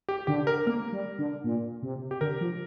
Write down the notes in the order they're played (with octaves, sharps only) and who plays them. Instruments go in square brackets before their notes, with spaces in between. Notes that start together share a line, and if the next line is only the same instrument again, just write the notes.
[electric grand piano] G4
[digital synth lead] D3 [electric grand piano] G4
[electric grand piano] A#4
[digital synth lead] A#3 [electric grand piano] A#4
[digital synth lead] G3
D3
A#2
C3
[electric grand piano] G4
[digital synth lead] D3 [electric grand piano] A#4
[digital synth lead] F3